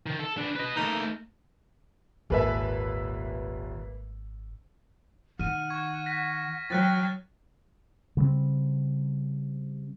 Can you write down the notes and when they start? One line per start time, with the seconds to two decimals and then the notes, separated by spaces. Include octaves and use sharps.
0.06 D#3
0.20 A4
0.38 B3 D4
0.56 B4 D#5
0.76 A3 A#3 D#4
2.30 D#1 G#1 A#3 A4 B4 E5 G#5
5.39 D#3 F#5 F6 D#7
5.70 C#6 G#6
6.06 A#6 B6
6.70 F#3 G5 F6 F#6 A6
8.17 C#3 G3 A3 C4